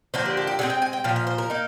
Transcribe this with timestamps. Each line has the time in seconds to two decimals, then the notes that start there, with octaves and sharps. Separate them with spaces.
0.14 D3 F3 A#3 D4 C5
0.25 G4
0.37 G4
0.47 G4
0.59 D3 G#3 C4 G#4
0.70 G5
0.82 G#5
0.93 G5
1.04 A#2 F3 F5
1.16 F5
1.27 C5
1.38 A#4
1.50 A#3 D#4